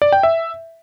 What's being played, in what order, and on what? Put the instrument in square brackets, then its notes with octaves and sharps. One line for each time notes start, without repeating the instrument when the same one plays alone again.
[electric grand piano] D5
G5
E5